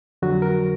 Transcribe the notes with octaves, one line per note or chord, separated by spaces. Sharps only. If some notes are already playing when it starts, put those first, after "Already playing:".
F2 D3 F#3 F#4
A#4